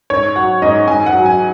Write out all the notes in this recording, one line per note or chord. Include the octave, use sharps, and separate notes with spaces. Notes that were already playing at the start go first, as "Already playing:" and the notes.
G#2 C#5
F#3 F#5
G#2 D#5
G#2 G#5
F#5
F#3
G#5